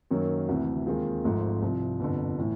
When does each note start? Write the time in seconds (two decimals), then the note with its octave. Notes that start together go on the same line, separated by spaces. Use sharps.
0.11 F#2 D#3 F#3 A#3
0.48 D2 C3 E3
0.86 D#2 D#3 G#3 C4 F4
1.24 G#1 G#2 F3 A3
1.62 C2 C3 F3
2.00 G1 F2 D3
2.38 A2 E3